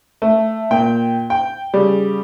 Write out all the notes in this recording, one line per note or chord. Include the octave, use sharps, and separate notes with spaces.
A3
A#2 G5
G5
C#3 G3